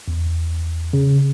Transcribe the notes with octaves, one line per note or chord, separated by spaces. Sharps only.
E2
C#3